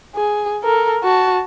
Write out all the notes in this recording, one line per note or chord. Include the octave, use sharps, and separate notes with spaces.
G#4
A4 A#4
F#4 A5